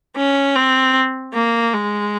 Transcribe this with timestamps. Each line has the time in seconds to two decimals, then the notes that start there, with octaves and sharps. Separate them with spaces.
0.17 C#4
0.56 C4
1.34 A#3
1.74 G#3